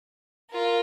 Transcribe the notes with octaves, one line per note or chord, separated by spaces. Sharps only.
F4 A#4